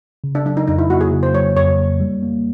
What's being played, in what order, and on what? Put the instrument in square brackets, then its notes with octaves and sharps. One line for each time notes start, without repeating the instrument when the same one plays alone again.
[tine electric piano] C#3
[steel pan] D4
[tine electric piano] F#3 [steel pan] D4
[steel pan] D#4
[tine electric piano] F2 [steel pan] D#4
[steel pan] E4
[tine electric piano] A#3 [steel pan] F#4
[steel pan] G#4
[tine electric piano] C#3
[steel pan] C5
[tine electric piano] F#3 [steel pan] C#5
[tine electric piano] F2 [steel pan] C#5
[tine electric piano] A#3
G3
A#3